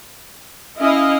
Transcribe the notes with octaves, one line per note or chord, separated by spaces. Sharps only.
C#4 E4 D#5 F5